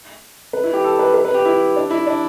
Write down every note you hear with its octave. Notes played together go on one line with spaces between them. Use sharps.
B4
E4
G4
A4
B4
B4
B4
G4
E4
D4
E4
D4